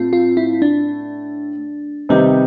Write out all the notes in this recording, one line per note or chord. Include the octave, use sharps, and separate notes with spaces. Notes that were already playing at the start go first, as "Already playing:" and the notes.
Already playing: A2 A3 C4 F4
F4
E4
D4
C3 D#3 G3 B3 C4 D#4